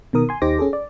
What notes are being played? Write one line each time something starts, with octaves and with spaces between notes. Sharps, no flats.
B2 D#3 A#4 D#6
G#5 C6
D#2 D#4 G4 C5 D6 A#6
C#4 G#4 A4
D5